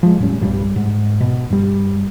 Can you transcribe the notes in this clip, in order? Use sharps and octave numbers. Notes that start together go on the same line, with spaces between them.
F3 G#3
E1 A2 G3 C#4
B1 G2 G3
G#2
B2
G2 G3